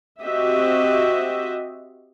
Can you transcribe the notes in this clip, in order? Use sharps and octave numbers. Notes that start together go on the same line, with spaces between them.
C4 F#4 G4 D#5 E5